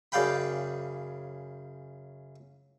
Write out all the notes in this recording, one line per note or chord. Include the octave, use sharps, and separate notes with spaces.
F#2 C#3 D5 F5 G5 B5